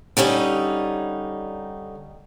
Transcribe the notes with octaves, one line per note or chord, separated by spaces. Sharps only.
D3 G3 C#4 D#4